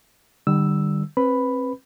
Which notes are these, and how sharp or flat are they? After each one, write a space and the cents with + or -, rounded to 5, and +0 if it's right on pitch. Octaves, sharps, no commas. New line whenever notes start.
D3 +45 G3 +0 E6 +0
C4 +30 B4 +0 B5 +5